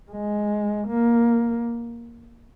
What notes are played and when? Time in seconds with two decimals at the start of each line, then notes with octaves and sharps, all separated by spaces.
0.12 G#3
0.87 A#3